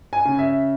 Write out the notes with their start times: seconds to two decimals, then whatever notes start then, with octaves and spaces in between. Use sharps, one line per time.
0.13 G#5
0.25 C#3
0.39 E5